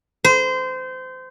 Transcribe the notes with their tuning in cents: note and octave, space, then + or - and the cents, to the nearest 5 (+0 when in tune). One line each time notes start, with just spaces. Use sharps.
C5 -25